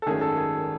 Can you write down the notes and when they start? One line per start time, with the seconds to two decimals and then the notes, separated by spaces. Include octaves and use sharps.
0.02 A4
0.06 G#1 F#2 D#3 A3 C#4 G#4
0.21 A4
0.37 G#4